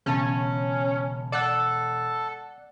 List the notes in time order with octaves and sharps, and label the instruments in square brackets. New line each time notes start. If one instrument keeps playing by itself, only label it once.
[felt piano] E1 [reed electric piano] C#3 A5 [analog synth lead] C#4
[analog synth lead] A4 [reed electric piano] D5 F#5 F#6